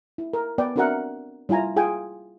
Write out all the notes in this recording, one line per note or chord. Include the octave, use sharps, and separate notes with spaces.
E4
A#4
B3 B4 D5 G5
C4 D4 F#4 A#4 E5 F#5
G3 E4 F4 G#5 A#5
F4 G#4 G5 G#5